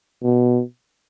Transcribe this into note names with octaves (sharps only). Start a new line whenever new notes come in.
B2